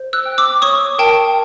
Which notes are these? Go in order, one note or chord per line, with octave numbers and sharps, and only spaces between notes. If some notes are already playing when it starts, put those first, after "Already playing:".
Already playing: C5
E6 F#6
G5
D6 E6
C#5 C#6 D#6
A#4 G5 A5